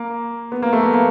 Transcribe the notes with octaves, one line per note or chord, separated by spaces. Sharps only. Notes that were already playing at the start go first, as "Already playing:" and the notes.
Already playing: A#3
B3
A#3
A3
B3
A#3